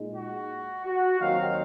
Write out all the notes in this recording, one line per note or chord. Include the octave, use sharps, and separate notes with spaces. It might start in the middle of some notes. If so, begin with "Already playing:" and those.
Already playing: A#2 G#3 D#4
F#4
F#4
D#2 D#3 F#3 C4 D#4 F5